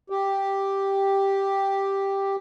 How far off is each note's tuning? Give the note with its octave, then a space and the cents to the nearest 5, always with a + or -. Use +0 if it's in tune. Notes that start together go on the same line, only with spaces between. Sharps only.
G4 +0